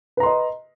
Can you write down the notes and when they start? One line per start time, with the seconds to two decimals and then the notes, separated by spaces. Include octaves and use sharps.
0.17 B4
0.20 A#5
0.23 C6
0.26 D#5